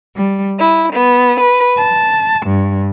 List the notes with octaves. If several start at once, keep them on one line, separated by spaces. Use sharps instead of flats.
G3
E4
B3
B4
A5
G2